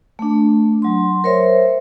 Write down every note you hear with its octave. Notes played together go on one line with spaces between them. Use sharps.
A3 D4
F#3 C6
A#4 C5 C#5 E5